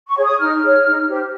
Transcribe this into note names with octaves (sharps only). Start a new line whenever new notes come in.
C#6
G#4 C#5
D#6
D#4 F6
G#4 C#5
D#4
G4 C5